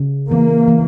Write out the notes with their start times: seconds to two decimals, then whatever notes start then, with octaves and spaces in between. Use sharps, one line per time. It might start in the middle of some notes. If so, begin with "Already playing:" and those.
Already playing: C#3
0.31 E3 A#3
0.68 E3